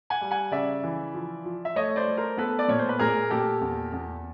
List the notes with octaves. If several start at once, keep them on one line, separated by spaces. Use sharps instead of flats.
F#5 G#5
G3
F#5 G#5
C#3 D5 E5
E3
F3
F3
E5
A3 C#5 D#5
C5 D5
A3
A#4 C5
B3 A4 B4
D5
A#2 C#5
C5
B4
A#2 G#4 A#4
A#2 G4 A4
E2
E2